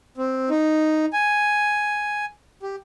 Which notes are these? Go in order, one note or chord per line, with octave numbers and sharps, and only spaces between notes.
C4
D#4
G#5
G4